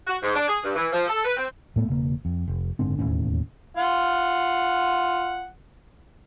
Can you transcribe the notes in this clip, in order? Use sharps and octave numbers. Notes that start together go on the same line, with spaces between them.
F#4
G#2
D4
G#4
G2
E3
F3
A4
B4
C4
A2 A3 B3
E1 C#3 A#3
F2
F1
F#1 G#2 D3 C4
E1 D#2 A2 C#4
F4 F#5